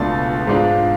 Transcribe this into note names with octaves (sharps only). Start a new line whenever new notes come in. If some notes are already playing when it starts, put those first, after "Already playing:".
Already playing: C#2 B2 A3 D4 F4 A6
G#2 G#3 D4 F4